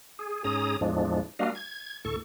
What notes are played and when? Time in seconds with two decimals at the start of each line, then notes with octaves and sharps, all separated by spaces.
0.19 G#4
0.44 G#2 C#4 G#4 A#5 D#6
0.81 E2 A2 F3 G#3 D4
1.39 G3 A#3 D4 F#4 D#5 F5
1.55 G#6
2.05 D2 A2 A4 C#6